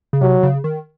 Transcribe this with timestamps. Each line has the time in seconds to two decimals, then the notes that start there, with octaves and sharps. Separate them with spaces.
0.13 C#3
0.21 C3 F#3
0.43 C#3
0.64 D#3